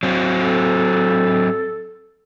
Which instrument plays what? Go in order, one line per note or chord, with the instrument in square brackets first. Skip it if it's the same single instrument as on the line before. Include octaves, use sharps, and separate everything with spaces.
[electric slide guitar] F#3 C4
[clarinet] A4